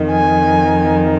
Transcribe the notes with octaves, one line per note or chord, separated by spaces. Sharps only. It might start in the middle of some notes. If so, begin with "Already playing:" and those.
Already playing: F2 D#3
G#5